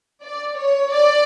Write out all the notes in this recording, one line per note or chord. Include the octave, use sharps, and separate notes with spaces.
D5
C#5
D5